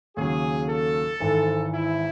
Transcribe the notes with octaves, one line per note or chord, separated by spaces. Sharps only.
D#2 C#3 F#3 G#4
A4
G#1 G#2 E3 G#3
E4